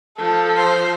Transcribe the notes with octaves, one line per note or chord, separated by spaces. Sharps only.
F3 A4
C5